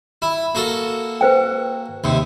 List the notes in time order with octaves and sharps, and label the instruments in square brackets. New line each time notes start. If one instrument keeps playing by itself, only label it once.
[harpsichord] E4
A#3 F#4 A4
[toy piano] B4 C5 G5
[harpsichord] D#2 C3